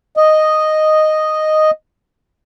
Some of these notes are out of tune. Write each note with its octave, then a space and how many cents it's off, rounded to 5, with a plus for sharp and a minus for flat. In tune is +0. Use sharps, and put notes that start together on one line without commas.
D#5 -5